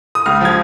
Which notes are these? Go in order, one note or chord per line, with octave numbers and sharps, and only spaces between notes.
D#6
C#2 F6
F3 G#6